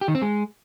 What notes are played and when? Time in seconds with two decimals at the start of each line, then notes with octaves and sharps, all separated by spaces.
0.01 G4
0.08 D#3
0.15 C4
0.22 G#3